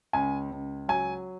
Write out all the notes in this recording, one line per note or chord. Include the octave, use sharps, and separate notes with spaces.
C#2 G#5
C#2
F#3 G#5